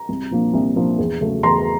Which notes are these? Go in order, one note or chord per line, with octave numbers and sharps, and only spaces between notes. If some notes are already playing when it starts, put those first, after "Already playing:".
Already playing: A#5
C2
A#2 F3 A#3 D4
C2
A#2 F3 A#3 D4
E2
C#3 F#3 A3
E2 A#5 C6